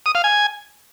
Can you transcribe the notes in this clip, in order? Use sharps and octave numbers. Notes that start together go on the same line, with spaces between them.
D#6
F5
G#5